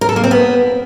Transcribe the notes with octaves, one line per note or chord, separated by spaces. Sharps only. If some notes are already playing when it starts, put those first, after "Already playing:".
A#4
A4
A#3
C4
B3